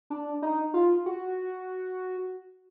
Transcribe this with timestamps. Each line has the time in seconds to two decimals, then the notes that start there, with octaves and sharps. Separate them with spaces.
0.10 D4
0.42 D#4
0.74 F4
1.06 F#4